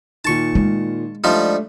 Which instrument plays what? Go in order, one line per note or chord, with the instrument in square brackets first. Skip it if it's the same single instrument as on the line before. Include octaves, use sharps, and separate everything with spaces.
[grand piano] A#2 D#3 [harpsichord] A5 C#6
[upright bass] G#3
[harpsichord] F3 G3 D#4 [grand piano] A3 D4